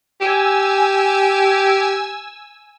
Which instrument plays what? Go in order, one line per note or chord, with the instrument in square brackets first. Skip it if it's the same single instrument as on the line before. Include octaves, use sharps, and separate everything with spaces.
[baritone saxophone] G4 [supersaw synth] G#5 E6